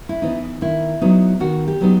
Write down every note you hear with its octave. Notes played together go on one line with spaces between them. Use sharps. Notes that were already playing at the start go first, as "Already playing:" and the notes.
E4
E3 B3 D#4
D#4
D#3 E4
F#3 B3 D#4
D#3 F#4
G4
F#3 B3 D#4